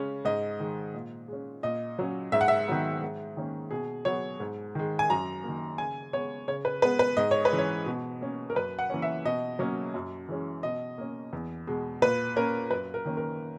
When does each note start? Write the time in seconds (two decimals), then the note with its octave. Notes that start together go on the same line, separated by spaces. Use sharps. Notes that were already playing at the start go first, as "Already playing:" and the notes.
Already playing: C#3 G#3 C#4
0.25 G#2 D#5
0.60 D#3 G#3
0.94 A#2
1.28 G#3 C#4
1.63 A#2 D#5
1.99 F#3 C#4
2.32 G#2 E5
2.41 F#5
2.48 E5
2.68 D#3 F#3 B3
3.02 G#2
3.37 D#3 A#3 C#4
3.71 B2 G#4
4.05 F#3 B3 C#5
4.40 G#2
4.75 D#3 G#3
4.99 G#5
5.10 F#2 A#5
5.44 D#3 A#3
5.78 C#3 G#5
6.13 G#3 B3 C#5
6.48 C#3 C#5
6.65 B4
6.82 G#3 B3 B4
6.99 B4
7.17 G#2 D#5
7.31 C#5
7.45 B4
7.52 E3 G#3 C#4
7.58 C#5
7.86 B2
8.21 A#3 C#4
8.50 A#4
8.55 F#2 B4
8.79 F#5
8.90 E3 A#3 C#4
9.02 E5
9.25 B2 D#5
9.59 F#3 A#3 C#4
9.94 F#2
10.28 E3 G#3 C#4
10.63 B2 D#5
10.98 A#3 C#4
11.33 E2
11.67 B2 G#3
12.02 A#2 B4
12.36 A#3 C#4 A#4
12.71 F#2 B4
12.94 A#4
13.05 D#3 A#3 C#4
13.17 A#4